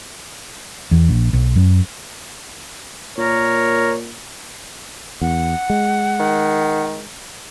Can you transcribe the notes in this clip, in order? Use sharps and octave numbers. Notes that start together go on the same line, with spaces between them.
E2
A#1
B1
F#2
A#2 A#4 C#5
E2 F#5
G#3
D#3